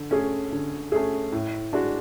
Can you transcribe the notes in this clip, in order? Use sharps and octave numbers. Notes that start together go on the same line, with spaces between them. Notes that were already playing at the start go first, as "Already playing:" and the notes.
Already playing: D3
A3 C#4 G#4
D3
A3 C#4 G#4
A2
G#3 D4 F#4